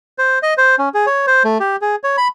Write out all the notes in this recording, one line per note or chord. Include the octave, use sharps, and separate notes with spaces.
C5
D#5
C5
C#4
G#4
C#5
C5
A3
G4
G#4
C#5
B5